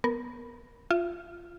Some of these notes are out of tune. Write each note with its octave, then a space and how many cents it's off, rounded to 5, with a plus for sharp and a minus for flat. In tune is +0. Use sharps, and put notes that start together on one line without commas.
B3 -15 A#4 +0
F4 -5 E5 +40